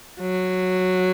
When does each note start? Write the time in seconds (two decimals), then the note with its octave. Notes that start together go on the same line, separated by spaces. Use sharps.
0.20 F#3